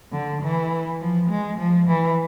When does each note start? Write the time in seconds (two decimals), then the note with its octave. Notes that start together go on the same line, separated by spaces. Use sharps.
0.12 D3
0.42 E3
1.00 F3
1.30 G#3
1.59 F3
1.88 E3